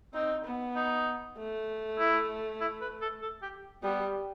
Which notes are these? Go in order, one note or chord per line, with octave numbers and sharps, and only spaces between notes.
C4 D#4
B3
D#4
A3
E4
E4
B4
A4
A4
G4
G3 B3